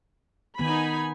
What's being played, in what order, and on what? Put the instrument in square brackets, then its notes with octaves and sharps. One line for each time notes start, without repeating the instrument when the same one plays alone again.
[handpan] D#3 B3 [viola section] D#4 G#5 B5